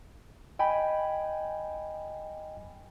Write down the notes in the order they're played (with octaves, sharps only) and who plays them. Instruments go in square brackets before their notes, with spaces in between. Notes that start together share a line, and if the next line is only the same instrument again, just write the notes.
[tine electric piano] D#5 G5 G#5 B5